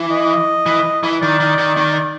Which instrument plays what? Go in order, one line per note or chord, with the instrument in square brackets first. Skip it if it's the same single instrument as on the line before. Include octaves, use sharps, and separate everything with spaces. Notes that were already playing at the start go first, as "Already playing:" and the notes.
Already playing: [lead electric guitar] E3
[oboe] D#5
[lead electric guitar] E3
E3
[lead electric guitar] D#3 [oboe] D5
[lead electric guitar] D#3
D#3
D#3